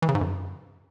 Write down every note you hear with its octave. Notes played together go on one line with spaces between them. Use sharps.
E3
C#3
G#2
F#2